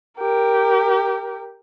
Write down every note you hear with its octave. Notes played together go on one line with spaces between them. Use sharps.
G4 A#4